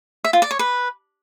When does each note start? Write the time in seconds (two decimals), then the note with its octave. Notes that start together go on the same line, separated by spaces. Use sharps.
0.24 E5
0.33 F4
0.42 D5
0.51 C#5
0.59 B4